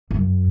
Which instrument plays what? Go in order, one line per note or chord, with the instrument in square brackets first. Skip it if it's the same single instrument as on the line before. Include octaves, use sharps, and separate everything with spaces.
[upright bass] F#2